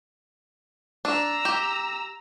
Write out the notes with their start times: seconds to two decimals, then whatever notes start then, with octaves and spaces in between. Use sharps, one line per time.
1.05 D4 A#5 E6
1.45 G4